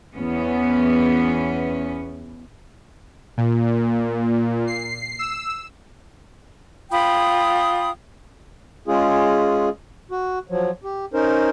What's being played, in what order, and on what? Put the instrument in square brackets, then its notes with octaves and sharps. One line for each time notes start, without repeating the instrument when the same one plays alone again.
[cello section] E2 B3 C#4
[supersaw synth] A#2
C7
E6
[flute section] F4 G5 B5 D#6
[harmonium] G#3 C#4 F4 G#4
F#4
F3 F#3
G4
C#4 D#4 A#4 C5